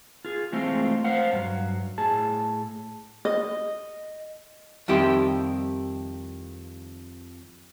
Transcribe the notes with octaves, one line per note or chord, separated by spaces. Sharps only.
F4 G#4
E3 G#3 A3 C4 F4
C5 F5 F#5
G2 F#3
A2 G#4 A5
D#5
F2 D#3 G3 E4 G4 C6